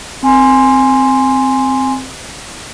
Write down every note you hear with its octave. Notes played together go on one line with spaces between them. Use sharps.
C4 G#5 C6